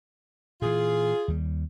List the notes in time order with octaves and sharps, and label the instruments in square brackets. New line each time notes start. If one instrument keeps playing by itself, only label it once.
[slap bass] A#2 E3 [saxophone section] F4 G#4
[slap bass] D#2 G3